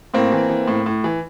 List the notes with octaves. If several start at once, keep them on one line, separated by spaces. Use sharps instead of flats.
A2 A#3 C4
E3
E3
A2
A2
E3